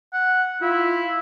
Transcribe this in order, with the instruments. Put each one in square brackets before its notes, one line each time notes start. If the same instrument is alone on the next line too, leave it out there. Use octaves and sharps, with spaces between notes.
[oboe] F#5
[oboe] E4 [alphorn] F4